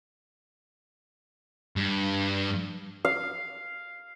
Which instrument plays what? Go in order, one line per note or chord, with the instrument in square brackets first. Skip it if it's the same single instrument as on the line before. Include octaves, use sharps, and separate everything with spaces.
[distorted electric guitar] G2
[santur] F5